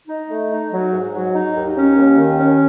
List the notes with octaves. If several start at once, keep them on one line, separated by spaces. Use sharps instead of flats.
D#4
A3
D#4
F#3
G#2
F#3
D#4
D#2
C#4
D#2
D#3
C#4